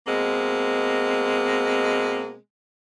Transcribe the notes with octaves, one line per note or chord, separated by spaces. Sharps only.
B2 G#3 A#3 C4